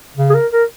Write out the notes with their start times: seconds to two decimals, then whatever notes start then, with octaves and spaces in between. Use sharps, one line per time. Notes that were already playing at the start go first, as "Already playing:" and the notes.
0.16 C#3
0.30 G#4
0.35 A#4
0.52 A#4